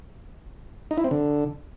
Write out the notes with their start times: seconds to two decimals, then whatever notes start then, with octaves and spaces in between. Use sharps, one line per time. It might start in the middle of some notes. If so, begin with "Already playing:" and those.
0.91 D#4
0.98 E4
1.04 C4
1.11 D3